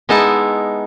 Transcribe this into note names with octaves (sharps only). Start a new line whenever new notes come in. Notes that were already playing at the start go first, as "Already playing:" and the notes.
G#3 B3 D#4 E4 A5